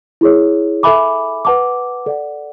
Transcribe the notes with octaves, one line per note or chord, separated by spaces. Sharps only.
E4 G#4 C#5
A4 E5 G#5 B5 D6
B4 F#5 A5 D6
A4 D5 F#5